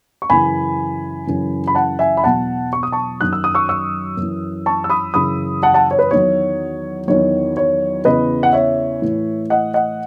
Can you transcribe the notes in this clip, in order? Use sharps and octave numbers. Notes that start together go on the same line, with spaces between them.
C#6
F#2 C#3 E3 G#5 B5
F#2 C#3 E3
B5
F#5 A5
E5 G#5
B5
E2 B2 F#3 F#5 A5
C#6
D#6
A5 C#6
F#2 D#3 F#3 F#6
E6
D#6
C#6 E6
C#6 E6
F#2
E3
A5 C#6
E6
B5 D#6
F#2 C#3 E3 B5 D#6
F#5 A5
F#5 A5
C#5
B4
E2 D#3 F#3 C#5
E2 D#3 F#3 C#5
C#5
E2 C#3 E3 B4 D#5
F#5
C#5 E5
A2 E3
D#5 F#5
D#5 F#5